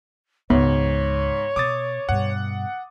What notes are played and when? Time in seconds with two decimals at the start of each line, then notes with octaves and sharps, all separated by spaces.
0.50 C#2 G#2 B3 C#5
1.56 B2 D6 D#6 A6
2.09 G2 B2 F#5